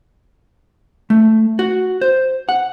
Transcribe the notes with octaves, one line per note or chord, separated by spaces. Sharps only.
A3
F#4
C5
F#5